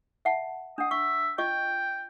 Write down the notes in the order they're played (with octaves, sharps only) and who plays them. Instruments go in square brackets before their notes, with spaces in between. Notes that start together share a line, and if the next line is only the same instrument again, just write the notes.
[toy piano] E5 F#5 A5
[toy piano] D4 F#5 [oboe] D#5
[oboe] E5 [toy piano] C#6
[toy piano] F4 D#5 C#6 [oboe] G5